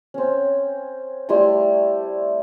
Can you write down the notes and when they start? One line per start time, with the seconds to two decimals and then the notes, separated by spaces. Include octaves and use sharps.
0.14 C4 C#4
1.29 G3 A3 E4 C6